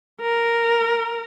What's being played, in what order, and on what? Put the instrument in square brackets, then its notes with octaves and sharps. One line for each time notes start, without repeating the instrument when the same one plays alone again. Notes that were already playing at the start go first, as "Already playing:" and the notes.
[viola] A#4